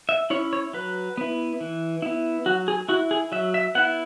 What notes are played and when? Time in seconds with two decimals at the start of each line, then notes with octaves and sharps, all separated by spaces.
0.09 E5
0.30 C#4 E4 C#5
0.53 C#5
0.73 F#3 B4
1.17 B3 E4
1.61 E3
2.02 B3 E4
2.46 F#3 F#4
2.68 G#4
2.89 E4 F#4
3.11 G#4
3.32 F#3 E5
3.54 E5
3.75 B3 E4 F#5